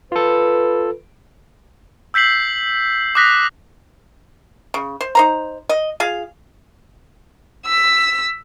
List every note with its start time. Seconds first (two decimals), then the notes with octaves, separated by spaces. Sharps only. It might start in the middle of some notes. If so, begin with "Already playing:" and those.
0.12 F4 A4 B4
2.14 E6 G6 B6 C7 F#7
3.15 D6 D#6 F#6 A#6 B6
4.74 C#3
5.01 C5
5.15 D#4 C5 A#5
5.69 D#5
6.00 F4 G#4 F5
7.65 E6 B6